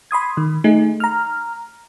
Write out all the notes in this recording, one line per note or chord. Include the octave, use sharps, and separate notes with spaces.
B5 C6 D#6 G#6
D#3
A3 D#4 G#4
A#5 F6